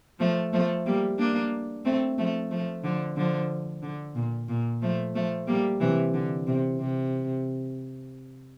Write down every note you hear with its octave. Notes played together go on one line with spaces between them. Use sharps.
F3 A3
F3 A3
G3 A#3
A#3 D4
A3 C4
F3 A3
F3 A3
D3 F3
D3 F3
D3
A#2
A#2
F3 A3
F3 A3
G3 A#3
C3 E3
D3
C3
C3